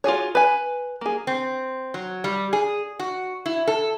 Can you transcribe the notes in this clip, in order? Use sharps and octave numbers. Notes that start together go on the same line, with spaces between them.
F4 F#4 G#4 C#5
B4 G#5
A#3 G#4
C4
F#3
G3
G#4
F#4
E4
A4